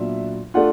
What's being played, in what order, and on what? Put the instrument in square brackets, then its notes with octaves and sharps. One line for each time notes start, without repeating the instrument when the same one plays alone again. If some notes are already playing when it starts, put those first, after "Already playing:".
Already playing: [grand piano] A#2 F#3 B3 D4 F4 E5
A3 D4 F4 F#5